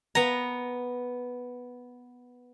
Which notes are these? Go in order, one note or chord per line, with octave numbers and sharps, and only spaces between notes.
B3 A#5